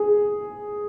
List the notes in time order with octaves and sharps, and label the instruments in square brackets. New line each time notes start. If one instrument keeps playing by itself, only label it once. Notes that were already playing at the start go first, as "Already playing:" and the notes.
Already playing: [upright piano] G#4